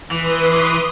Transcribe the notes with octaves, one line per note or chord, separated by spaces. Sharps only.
E3 B4 C6 D#6